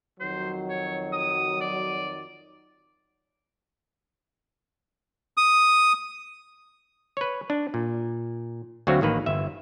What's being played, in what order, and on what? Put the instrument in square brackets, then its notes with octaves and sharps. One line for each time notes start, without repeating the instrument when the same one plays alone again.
[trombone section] F2 D#3 F#3 [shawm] C5
[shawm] C#5
D#6
D5
[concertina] D#6
[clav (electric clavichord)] B4 C#5
D4
A#2
D2 D3 F#3 C4 F#4 F5
A1 D#3 A#3 B4
G1 E5